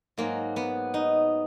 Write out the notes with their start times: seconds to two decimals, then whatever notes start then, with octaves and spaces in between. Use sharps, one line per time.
0.18 G#2 F#3 A#3
0.56 B3
0.94 D#4